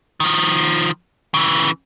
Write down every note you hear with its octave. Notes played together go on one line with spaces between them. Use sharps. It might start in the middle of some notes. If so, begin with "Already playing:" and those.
D#3 F3
C#3 E3